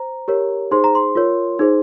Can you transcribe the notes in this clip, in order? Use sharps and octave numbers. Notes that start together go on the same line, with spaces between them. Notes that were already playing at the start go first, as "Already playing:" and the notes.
Already playing: C5 A#5
G4 A#4 C#5
D#4 G#4 C5 C6
A#5
C6
F4 A#4 C#5
D#4 G#4 C5